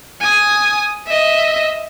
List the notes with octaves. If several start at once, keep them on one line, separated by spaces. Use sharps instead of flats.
G#5 D#6
D#5 E5